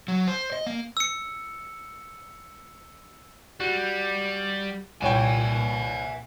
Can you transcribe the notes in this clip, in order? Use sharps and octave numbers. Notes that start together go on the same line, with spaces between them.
F#3
C5
D#5
A#3
E6 C#7
G3 F#4
C2 A#2 C#5 E5 G5 G#5